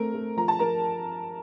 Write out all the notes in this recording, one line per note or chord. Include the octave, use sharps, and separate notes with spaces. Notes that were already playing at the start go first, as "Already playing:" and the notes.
Already playing: A3 C4 A#4
A3
F3 A#5
A5
F3 A#4 A#5